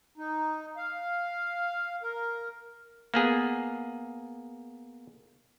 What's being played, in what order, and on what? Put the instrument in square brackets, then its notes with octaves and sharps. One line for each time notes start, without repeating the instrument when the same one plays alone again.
[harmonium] D#4
F5
A#4
[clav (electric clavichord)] A#3 B3 G#4